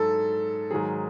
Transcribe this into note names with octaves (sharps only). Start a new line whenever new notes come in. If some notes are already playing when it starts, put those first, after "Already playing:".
Already playing: G#2 F#3 A4
G#2 D#3 F#3 G#4